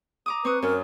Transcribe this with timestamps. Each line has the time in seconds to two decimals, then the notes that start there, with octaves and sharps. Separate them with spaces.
0.26 A#5 D6 D#6
0.45 C4 B4 C#6 D#6
0.62 F#2 C#4 A#4